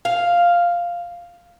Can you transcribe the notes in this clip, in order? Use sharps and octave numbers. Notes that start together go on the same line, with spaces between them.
F5